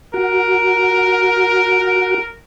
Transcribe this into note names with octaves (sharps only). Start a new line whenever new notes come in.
F#4 A#4